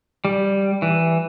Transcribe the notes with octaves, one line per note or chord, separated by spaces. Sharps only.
G3
E3